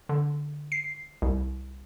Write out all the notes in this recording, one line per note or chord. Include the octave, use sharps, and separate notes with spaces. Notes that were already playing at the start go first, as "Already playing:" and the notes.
D3
C7
C2